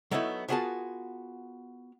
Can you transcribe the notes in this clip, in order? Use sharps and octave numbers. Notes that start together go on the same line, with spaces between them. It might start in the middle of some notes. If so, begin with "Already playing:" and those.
F#3 A3 B3 D#4 E4
B3 F4 F#4 G#4 A#4 A5